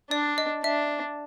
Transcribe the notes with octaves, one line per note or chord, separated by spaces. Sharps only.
D4 D5
D#5
D4 E5